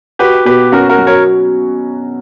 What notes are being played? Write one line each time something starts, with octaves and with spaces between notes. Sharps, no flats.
F#4 G4 B4
B2 G4 B4
C#4 F#4 A#4
F#4 A#4
F#3
A#4 C#5